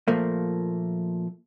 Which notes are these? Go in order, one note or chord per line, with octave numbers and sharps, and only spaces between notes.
A#2 F3 A3 A#3